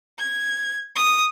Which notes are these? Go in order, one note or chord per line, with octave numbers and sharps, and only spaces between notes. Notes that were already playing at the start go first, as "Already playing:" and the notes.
G#6
D#6